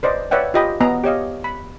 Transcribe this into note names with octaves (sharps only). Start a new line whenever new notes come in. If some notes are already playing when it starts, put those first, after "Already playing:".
B4 C5 D5 D#5
B4 C#5 D5 E5 F#5 G5
F4 G4 D#5 G5 B5
B3 D#5 A#5
G4 C#5 D#5 F5
B5